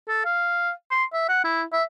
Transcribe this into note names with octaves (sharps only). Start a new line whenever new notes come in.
A4
F5
C6
E5
F#5
E4
E5